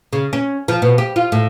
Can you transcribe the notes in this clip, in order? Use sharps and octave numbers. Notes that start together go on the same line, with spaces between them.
C#3
C#4
F3
B2
G4
F4
A2